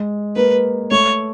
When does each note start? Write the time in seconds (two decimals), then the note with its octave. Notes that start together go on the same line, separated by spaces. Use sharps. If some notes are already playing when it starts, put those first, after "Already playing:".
Already playing: G#3
0.36 A#3 B4
0.91 A3 C#5